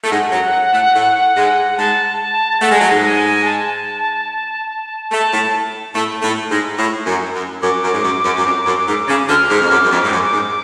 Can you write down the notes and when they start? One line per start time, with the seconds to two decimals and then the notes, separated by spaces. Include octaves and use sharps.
0.04 A3
0.11 G#2 G#3 F#5
0.32 F#2 F#3
0.73 A2 A3
0.94 A2 A3
1.35 G#2 G#3
1.78 G#2 G#3 A5
2.20 A5
2.61 A3 F#5
2.71 G#3
2.80 F#3
2.89 G#2 G#3
3.03 G#5
3.45 A5
5.11 A3 A5
5.32 A2 A3
5.95 A2 A3
6.22 A2 A3
6.50 G#2 G#3
6.78 A2
7.06 F#2
7.34 F#2
7.62 F#2 D6
7.83 F#2
7.93 G#2
8.04 F#2
8.24 F#2
8.38 F#2
8.45 F2
8.66 F#2
8.87 G#2
9.08 C#3
9.29 D2 D3 F6
9.50 G#2
9.61 F2
9.70 F#2 D6
9.84 F#2
9.91 F2
10.04 G#2
10.12 F#2
10.33 G#2